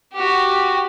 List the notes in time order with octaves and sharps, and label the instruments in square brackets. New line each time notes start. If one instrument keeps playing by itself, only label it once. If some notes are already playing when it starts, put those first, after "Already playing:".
[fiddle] F#4 G4